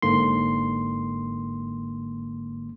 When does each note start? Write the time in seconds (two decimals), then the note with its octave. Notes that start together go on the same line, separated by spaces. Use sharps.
0.02 G1 G#2 D3 A#3 C6